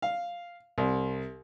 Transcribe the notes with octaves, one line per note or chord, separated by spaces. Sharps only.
F5
C2